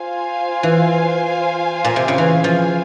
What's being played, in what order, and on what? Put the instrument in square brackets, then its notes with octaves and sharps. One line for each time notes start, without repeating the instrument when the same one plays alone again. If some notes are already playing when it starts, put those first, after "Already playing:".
Already playing: [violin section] F4 C5 F5 G#5
[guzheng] E3
A#2
C3
C#3
E3
F3